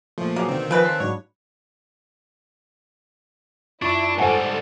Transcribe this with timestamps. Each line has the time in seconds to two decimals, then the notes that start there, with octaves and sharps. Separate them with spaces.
0.18 A#2 F3 A3
0.36 F#3 A#3 B3 G#4
0.48 B2 D3 D#3 C4
0.71 C#3 F3 B4
0.85 A5 C6
1.00 G#2 F#3 D4 C#5
3.82 F#2 D4 E4 F4 C#6
4.18 G#2 G3 A4 C5 F#5 G#5